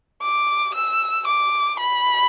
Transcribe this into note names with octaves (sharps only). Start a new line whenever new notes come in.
D6
E6
D6
B5